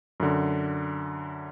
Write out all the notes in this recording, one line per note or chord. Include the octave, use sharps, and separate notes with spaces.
F#2 D3